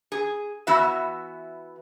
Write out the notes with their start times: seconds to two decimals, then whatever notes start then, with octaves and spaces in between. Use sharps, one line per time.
0.12 G#4
0.67 E3 B3 E4 F#4 E5